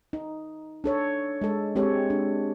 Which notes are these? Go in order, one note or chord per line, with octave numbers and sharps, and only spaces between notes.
D#4
D4 A4 C#5
G#3 A4
G#3 C4 G4 A4 C#5
D4